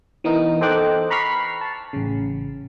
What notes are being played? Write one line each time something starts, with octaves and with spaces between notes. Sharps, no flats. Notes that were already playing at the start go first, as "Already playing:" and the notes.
E3 B3 D#4 A#4
A4 C5 D#5 G5 D6 F#6
A#5 B5 C#6 F6 B6 C7
A5
A1 C#3